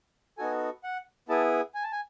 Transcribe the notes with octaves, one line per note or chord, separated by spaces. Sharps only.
B3 D#4 F#4 A4 G#5
F#5
B3 E4 G#4 A5
G#5
A5
G#5